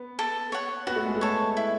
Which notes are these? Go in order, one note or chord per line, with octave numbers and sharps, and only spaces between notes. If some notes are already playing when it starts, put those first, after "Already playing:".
Already playing: B3
A4
C#5 F#5
B3 F#4
A3
G#3
A3
A4 C#5
E4